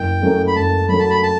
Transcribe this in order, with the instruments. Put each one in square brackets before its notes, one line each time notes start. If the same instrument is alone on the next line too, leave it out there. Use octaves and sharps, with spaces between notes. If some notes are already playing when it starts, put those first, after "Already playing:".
Already playing: [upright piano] F#1 [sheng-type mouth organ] G5
[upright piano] F#2 F#3 A3
[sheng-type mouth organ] B5
[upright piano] F#1 [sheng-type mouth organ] A5
[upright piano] F#2 F#3 A3 [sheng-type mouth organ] B5
[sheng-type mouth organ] A5
B5
A5